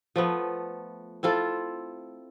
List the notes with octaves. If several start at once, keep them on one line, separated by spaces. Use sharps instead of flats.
F3 A3 B3
C4 E4 F4 A4